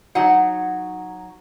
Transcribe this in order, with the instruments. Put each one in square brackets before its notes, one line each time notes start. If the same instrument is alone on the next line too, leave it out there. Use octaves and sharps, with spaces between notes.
[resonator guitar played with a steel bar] F#3 D#4 F#5